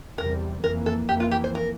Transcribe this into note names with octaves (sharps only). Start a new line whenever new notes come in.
E2 C3 G3 A#4
F2 E3 A#3 A#4
A4
F2 E3 A#3 G4
F4
G4
C5
A#4